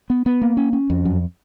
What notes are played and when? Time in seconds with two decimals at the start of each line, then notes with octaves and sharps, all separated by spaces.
0.10 B3
0.26 B3
0.42 A#3
0.57 C#4
0.73 C#4
0.90 F2
1.05 F#2